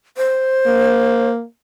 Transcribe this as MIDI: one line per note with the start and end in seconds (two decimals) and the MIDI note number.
0.17 1.29 72
0.66 1.44 58